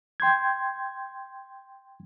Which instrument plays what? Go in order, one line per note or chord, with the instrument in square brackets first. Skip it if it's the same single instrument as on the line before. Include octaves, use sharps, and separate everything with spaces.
[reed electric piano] G5 C6 G6 G#6